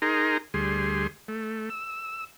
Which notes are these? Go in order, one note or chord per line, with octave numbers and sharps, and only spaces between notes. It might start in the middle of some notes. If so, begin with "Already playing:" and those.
D#4 G#4 A#4 A#5 C6
D2 G3 G#4 C6
A3
E6